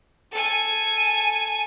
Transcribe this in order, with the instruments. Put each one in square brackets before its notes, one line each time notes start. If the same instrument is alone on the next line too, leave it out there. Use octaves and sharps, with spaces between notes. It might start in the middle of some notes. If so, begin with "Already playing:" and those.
[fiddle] A4 G#5